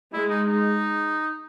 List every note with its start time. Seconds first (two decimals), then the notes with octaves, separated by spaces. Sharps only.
0.13 G#3 E4
0.30 D#4
0.47 D#4